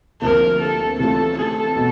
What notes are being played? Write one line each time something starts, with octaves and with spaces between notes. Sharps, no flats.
D2 C3 F3 A#3 A#4
A4
C3 E3 A3 C#4 F4 A4
A4
B2